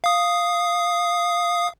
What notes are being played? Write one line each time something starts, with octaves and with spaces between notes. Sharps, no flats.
F5 D#6